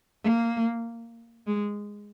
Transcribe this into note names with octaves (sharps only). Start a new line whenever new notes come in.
A#3
G#3